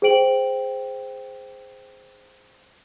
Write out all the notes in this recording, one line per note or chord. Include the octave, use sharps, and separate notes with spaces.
G#4 C5 G5 D7 F#7